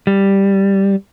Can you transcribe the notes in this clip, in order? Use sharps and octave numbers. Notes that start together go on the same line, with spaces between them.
G3